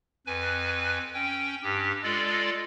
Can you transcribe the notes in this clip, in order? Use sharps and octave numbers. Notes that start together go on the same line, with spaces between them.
F2 B4 G#5
C#4 G5
G2 G4
G#3 F4 A4 D5